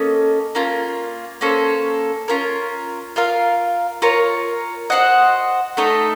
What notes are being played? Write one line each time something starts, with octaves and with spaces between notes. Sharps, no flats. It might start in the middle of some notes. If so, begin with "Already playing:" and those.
Already playing: A#3 C#4 A4 D#5
A#3 C#4 F4
A#3 C#4 A4 C5
C#4 F4 A#4
F4 A#4 F5
F4 A#4 C#5
F#4 C5 D#5 F#5
A3 D#4 A4 D#5